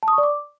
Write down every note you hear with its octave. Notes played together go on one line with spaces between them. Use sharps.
A5
D#6
C#6
D5
D6